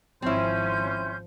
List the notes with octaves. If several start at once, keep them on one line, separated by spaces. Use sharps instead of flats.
G#1 F3 C4 C#4 E4 C6 G6